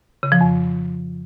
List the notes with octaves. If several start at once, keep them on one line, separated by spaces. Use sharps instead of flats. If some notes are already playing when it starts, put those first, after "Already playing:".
C#3
F3
F2